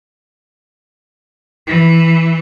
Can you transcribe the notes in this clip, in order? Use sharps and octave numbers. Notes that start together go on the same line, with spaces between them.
E3